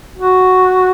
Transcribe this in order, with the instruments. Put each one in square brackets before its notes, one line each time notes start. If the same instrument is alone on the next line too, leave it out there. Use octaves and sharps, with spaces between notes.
[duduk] F#4